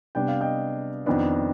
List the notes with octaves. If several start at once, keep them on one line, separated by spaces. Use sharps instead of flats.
C3 G3 B3 D4 G5
F5
D#5 G5
F2 D#3 B3 D4